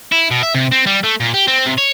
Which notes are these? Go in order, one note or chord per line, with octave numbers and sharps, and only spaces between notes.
E4
B2
E5
C3
C4
G3
A3
A#2
G4
C4
C3
C#5